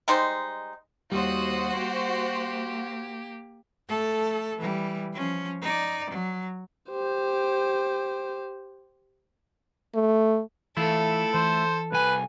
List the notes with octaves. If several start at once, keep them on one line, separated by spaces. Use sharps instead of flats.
G3 G#3 D#4 C5
D#2 G3 F#4 C5 D#6 F#6
A#3 G4
A3 A4
E3 G3
F3 C#4
D#4 D5
F#3
G4 C5
A3
E3 A3 E4 F4 A4
E3 C5
C2 B4 G#5